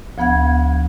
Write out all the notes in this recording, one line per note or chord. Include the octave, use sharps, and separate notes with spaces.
D2 F3 B3 F#5 G#6